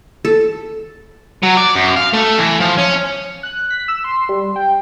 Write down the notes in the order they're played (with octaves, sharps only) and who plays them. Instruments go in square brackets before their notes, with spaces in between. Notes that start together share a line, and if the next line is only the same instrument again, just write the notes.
[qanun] A4
[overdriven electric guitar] F#3
D5
F#2
F5
A3
E3
F3
C#4
[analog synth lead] F#6
B6
E6
C6
G3
G5